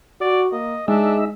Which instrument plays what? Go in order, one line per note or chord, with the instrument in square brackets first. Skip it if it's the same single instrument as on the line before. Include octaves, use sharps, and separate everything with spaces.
[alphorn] F#4 [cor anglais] D5
[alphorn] A#3 [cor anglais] D#5
[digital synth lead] G#3 [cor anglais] D4 [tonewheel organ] D#4 E5 [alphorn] G#4